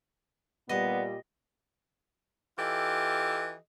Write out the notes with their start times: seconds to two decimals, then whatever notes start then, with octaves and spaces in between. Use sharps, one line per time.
0.69 A#2 G3 B3 D#5
2.58 E3 F4 G4 A4 D#5